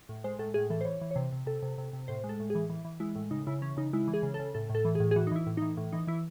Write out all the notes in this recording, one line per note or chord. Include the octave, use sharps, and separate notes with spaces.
A2
G#3 C5
A2 A4
A2 G#4
E3 A4
C5
E3 C#5
E3
C#5
C3 C5
C3
C3 A4
C3
C3
C3
A2 C5
G#3
A4
A2
E3 G#4
E3
E3
G#3 E4
A2
C#3 D#4
C#3 E4
E3 C#4
C#3 D#4
G#3 E4
E3
G#4
C#3
A4
C#3
A2 A4
A2
A4
E3
A2 G#4
G#4
E3 F#4
D#4
E3 E4
A2
E3 D#4
A2
E3 D#4
E3 E4